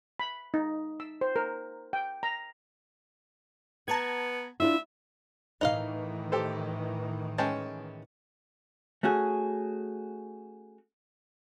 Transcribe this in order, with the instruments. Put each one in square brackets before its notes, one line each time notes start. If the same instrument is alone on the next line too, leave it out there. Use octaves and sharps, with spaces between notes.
[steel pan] B5
D#4
E6
C5
A#4
G5
A#5
[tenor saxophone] B3 [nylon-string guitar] F#5 [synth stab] A5 A#5 G#6
[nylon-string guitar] D4 E4 F4 [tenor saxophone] E5
[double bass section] A2 D#3 E3 [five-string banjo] D#4 D#5 F5
[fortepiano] G4 A4 C5
[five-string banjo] G#3 [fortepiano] C#4 G5 A5
[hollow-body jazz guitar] A3 C#4 F#4 G#4